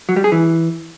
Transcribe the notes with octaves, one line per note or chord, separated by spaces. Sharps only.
F#3
G3
G#4
E3